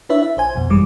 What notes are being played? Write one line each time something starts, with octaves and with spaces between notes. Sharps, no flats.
D4 E4 B4 C#5 E5
E5
A#1 C5 G#5
B1 F2 B2
G#1 F#2 E3 G3 G#3 D6